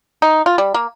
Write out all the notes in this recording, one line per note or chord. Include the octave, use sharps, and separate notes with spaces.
D#4
F4
G3
A#3